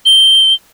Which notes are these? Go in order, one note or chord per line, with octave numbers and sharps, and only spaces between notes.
G7